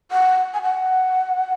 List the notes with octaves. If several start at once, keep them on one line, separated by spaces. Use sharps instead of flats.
F#5
G#5
F#5